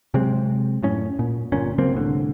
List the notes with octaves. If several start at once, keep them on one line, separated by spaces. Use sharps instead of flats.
C3 F#3 G#3 C4
F#2 A2 C#4
A#2
G1 A#2 C#4
C#3 F#3 A#3 C4
C2 A2 D3